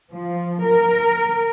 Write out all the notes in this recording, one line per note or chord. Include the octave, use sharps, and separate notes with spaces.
F3
A#4